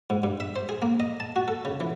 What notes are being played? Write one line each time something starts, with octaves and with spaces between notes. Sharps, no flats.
G#2
G2
E5
C5
G#4
A#3
D#5
A5
F#4
A4
C#3
E3